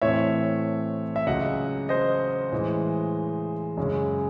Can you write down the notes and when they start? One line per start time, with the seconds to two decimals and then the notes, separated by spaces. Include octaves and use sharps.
0.02 A2 E3 A3 C4 C#5 E5
1.16 E5
1.27 C#2 C#3 F#3 D#5 F#5
1.89 C5 D#5
2.52 A2 E3 G#3
3.77 F#2 C#3 G#3 C#4